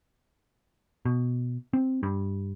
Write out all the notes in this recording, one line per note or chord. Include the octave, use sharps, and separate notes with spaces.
B2
C4
G2